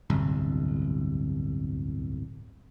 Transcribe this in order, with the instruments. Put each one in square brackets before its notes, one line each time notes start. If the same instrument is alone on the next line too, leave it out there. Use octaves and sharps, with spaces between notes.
[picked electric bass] D1 G1 C2